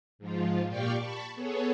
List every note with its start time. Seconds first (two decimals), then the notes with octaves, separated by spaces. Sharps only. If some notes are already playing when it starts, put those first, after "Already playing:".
0.19 G#2 F3 F4
0.68 A#2 G4 D5 F5 G5 C#6
0.98 A5 B5 C#6
1.35 B3 G#4 A4 C#5